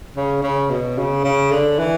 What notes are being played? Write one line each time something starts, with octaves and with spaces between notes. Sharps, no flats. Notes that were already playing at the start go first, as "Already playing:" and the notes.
C#3
C#3
B2
C#3
C#3
D3
E3